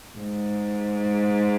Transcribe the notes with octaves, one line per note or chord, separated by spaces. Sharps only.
G#2